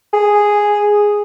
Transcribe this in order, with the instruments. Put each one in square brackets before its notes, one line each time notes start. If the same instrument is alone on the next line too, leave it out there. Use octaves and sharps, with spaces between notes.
[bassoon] G#4